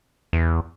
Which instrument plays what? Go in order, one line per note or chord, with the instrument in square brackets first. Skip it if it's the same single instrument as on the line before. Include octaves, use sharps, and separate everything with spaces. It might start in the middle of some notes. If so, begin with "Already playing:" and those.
[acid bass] E2